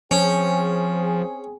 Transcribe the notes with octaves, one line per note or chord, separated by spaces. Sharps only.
F3 C4 C#4 G#4